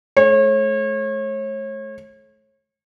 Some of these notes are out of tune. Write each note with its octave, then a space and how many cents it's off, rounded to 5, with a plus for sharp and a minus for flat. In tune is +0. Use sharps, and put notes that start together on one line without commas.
A3 -40 C#5 -35